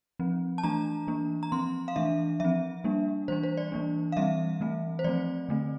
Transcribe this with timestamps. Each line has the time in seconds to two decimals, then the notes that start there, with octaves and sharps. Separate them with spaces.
0.19 F3 C4
0.58 A5
0.63 E3 A3 D4 A#5
1.07 E3 A#3 D4
1.43 A#5
1.52 F3 C4 C6
1.88 F5
1.96 E3 A3 D4 E5
2.40 F3 C4 E5
2.84 G3 A#3 D4
3.28 E3 G3 D4 C5
3.43 C5
3.57 D5
3.72 E3 A#3 D4
4.12 F5
4.17 E3 G3 C4 E5
4.61 E3 A3 C4
4.99 C5
5.04 F3 A3 C4 D5
5.49 D3 A3 C4